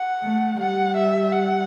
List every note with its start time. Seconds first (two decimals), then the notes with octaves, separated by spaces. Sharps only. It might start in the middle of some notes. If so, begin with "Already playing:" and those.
Already playing: F#5
0.23 A3
0.59 G3 F#5
0.96 E5
1.32 F#5